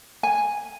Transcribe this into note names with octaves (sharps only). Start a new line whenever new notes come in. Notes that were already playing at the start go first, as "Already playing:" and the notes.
G#5